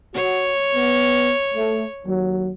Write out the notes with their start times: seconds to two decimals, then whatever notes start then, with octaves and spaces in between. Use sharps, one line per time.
0.15 F#4 C#5
0.74 B3
1.54 A3
2.05 D#2 F#3